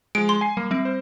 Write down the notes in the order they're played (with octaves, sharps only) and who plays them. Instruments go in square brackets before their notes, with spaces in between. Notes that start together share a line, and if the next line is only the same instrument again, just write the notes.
[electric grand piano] F3 G#3 [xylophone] D7
[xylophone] C6
[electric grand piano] G#5 C7
[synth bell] G3 [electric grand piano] A#3
[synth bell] G3 C4 D7 [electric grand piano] E5
[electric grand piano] C5